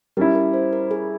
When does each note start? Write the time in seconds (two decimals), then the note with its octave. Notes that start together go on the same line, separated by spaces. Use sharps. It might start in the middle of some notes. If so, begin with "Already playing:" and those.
0.17 G3 C#4 E4 A#4
0.35 A#4
0.53 C5
0.73 A#4
0.91 G#4